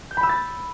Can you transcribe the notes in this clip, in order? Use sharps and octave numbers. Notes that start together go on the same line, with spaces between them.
G6
B5
E6
A6